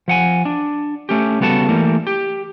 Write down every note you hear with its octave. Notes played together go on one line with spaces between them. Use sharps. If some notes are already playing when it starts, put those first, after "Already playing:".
F3 F#5 G#5
D4
A3 C#4 G4
C#3 G3 B3 F#4 A4 A5
E3 G3 A3 A#3
G4